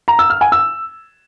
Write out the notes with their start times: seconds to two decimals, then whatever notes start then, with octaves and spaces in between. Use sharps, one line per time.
0.08 A#5
0.19 E6
0.30 F6
0.41 G#5
0.52 E6